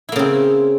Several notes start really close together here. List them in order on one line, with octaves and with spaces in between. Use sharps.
E4 A#3 C#3 C4